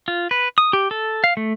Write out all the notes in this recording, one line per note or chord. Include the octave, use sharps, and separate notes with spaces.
F4
B4
D#6
G4
A4
F5
A3